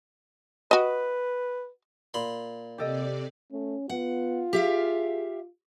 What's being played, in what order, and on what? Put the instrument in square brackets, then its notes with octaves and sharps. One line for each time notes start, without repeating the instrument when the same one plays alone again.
[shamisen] F#4 D#5 [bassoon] B4
[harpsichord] A#2 B5 C6
[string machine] C3 D5 [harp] G4 A4 D#5
[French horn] A3 [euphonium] C#4
[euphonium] B3 [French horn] F4 [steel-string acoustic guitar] F#5
[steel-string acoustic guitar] G4 E5 F5 [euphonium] G#4